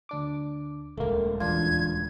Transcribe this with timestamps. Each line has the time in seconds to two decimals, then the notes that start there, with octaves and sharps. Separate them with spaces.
0.09 D2 D4 D6
0.97 D#1 C#2 A3 A#3
1.40 E2 E3 D4 F4 G#6